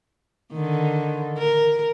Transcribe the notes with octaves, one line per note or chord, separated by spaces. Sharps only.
D3 D#3
A#4